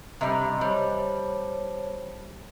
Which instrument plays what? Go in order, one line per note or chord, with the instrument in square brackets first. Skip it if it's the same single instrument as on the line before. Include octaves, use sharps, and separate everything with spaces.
[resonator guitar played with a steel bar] C3 G3 [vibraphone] D#5
[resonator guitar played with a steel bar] G3 [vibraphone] C5 C#5 A5